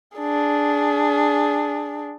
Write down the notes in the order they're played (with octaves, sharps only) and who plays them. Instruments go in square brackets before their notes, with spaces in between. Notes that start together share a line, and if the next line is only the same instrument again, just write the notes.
[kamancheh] D4 G#4